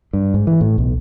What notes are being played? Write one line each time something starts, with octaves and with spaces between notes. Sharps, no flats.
G2
G#2
E3
A2
B1